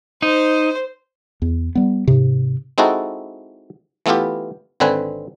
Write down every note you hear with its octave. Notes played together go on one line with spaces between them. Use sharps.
D#4 C5
E2
G3 B3
G#2 C3
G#3 C4 D#4 E4 F#4 A4
E3 A3 B3 E4 F4 G4
G#1 D3 C4 B4 G#5